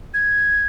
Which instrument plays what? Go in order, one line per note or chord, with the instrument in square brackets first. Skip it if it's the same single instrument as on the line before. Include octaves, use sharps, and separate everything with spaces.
[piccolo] G#6